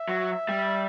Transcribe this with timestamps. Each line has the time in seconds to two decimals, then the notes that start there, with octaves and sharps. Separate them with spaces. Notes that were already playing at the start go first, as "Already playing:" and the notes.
Already playing: E5
0.09 F#3
0.49 G3